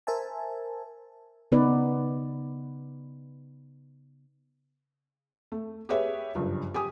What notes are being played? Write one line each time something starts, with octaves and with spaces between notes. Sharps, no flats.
A#4 C5 E5 G#5 A5
C#3 B3 D#4 B4 D5
A3
G4 G#4 B4 C#5 E5
F#1 G2 F3
G4 G#5 D#6